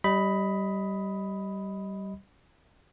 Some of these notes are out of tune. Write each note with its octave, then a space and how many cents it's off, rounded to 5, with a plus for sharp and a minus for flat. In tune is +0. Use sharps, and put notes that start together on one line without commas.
G3 -20 D#5 +15 B5 +5